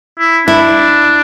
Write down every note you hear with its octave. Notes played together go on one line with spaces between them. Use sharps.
E4
D4 E4